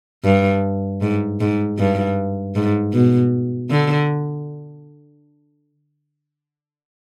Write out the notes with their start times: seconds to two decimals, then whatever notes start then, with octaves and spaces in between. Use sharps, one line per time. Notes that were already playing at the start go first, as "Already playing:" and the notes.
0.25 G2
1.02 G#2
1.41 G#2
1.79 G2
2.55 G#2
2.93 B2
3.71 D3